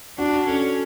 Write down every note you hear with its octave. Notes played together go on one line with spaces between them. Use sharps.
D4 F#4
C#4 A4